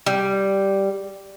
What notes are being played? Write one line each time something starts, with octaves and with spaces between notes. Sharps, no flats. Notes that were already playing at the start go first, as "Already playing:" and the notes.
G3